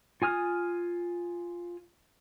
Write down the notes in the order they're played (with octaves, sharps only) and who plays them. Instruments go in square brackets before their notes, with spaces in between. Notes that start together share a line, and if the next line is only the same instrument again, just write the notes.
[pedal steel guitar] F4 G#5 D#6 F6